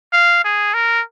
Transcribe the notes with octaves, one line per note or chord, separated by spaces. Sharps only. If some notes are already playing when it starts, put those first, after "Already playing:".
F5
G#4
A#4